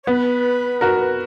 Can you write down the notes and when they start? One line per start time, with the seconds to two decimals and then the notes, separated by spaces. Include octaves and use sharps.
0.04 C#5
0.07 B3 B4
0.81 F#4 A#4